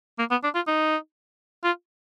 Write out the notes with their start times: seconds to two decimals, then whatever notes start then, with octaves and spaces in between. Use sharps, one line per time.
0.19 A#3
0.31 B3
0.43 D4
0.55 F4
0.67 D#4
1.64 F4